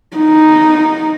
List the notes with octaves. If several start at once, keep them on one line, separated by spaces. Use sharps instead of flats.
D#4